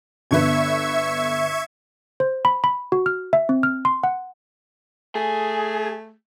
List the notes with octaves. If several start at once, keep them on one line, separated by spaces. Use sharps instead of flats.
G1 D3 B3 E5 C#6 G#6
C5
B5
B5
F#4
F6
E5
C4
F6
C6
F#5
A3 G#4